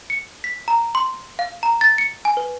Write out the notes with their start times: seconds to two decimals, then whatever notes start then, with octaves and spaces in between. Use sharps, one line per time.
0.10 C#7
0.44 B6
0.68 A#5
0.95 C6
1.39 F5
1.63 A#5
1.81 A6
1.98 C#7
2.25 G#5
2.37 B4